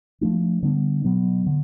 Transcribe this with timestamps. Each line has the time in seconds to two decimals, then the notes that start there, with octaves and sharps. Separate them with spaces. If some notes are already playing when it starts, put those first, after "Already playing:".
0.21 F3 A3 D4
0.63 D3 G3 B3 D4
1.04 B2 F#3 B3
1.46 D3